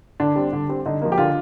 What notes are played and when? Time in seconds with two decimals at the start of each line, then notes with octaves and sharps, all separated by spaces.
0.20 D3 D4
0.36 G3 C4
0.53 D3
0.69 G3 C4
0.86 D3 D#4
1.02 F3 A#3
1.12 G4
1.18 D3 F4